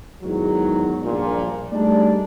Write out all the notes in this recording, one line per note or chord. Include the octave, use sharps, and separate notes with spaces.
E2 G#2 D#3 F#3
A#1 G2 A#2
G3 A3 D4 D#4 G#4 D5